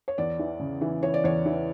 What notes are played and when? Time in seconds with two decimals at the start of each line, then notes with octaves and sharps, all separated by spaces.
0.08 C#5
0.18 E2 D5
0.39 E3
0.60 C#3
0.81 E3
1.03 E3 C#5
1.14 D5
1.24 E2 C#5
1.46 E3